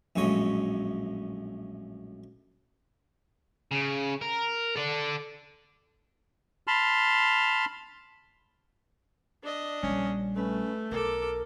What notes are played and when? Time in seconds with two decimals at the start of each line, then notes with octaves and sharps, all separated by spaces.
0.16 A#1 F#2 A2 G#3 C#5
3.71 C#3
4.21 A#4
4.76 A4 D5
6.67 A5 B5 C6 F6
9.43 D4 D#5
9.83 A#1 G3 C#4
10.36 A3 C#4 B4
10.91 B1 A4 A#4 D6